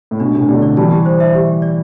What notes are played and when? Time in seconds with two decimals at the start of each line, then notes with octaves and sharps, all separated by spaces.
0.11 A2
0.20 B2 D4
0.35 A2 C3 D4
0.48 B2 D3 G4
0.62 D5
0.77 E3 G3 A5
0.91 G4
1.06 C5
1.20 E5
1.35 G4
1.48 G4
1.62 D5